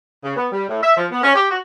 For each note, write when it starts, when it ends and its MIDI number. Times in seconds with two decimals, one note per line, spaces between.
0.23 0.32 49
0.36 0.47 59
0.52 0.65 55
0.69 0.79 45
0.82 0.92 76
0.97 1.07 53
1.11 1.21 59
1.24 1.32 61
1.35 1.48 67
1.50 1.58 66